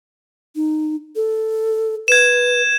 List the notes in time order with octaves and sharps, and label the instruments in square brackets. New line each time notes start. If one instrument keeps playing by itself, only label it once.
[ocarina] D#4
A4
[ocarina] B4 [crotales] G#6 E7